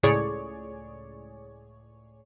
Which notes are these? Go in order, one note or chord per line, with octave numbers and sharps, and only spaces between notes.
C#2 A2 G#4 C#5 D5